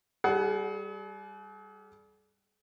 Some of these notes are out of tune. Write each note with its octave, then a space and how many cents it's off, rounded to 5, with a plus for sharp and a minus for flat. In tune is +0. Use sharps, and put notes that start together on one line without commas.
G3 +0 G#4 +45 F#5 +20